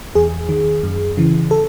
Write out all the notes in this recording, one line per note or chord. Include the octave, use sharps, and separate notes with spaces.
E2 G#4
D#3
F#2
C#3 E3
A4